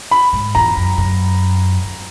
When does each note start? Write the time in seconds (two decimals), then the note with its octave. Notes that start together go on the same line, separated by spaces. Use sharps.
0.11 B5
0.33 G#2
0.55 E2 A#5
0.77 F#2
0.98 F#2
1.85 F#2